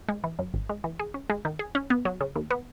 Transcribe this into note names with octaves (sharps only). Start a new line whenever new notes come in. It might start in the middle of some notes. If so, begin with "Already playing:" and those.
G#3
E3
F#2
G#1
G#3
E3
G#4
C#4
G#3
D#3
G#4
C#4
B3
F#3
C#3
D#2
B3